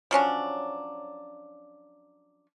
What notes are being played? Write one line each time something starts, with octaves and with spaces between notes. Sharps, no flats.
F3 F#3 C#4 D4